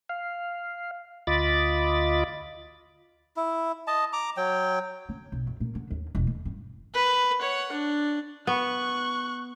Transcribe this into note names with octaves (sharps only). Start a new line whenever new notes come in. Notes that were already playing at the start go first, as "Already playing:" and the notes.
F5
D2 F4 D#5 B5 D6 A6
E4
D#5 A5
A#5 D6
F#3 G5
D3
B1
F#2
A#2
D3
D#2
E1
D3
G2
B4
C#5 F#5
D4
B3 C#6 F#6